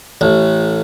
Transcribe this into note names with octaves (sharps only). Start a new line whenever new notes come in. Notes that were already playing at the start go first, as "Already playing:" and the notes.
A1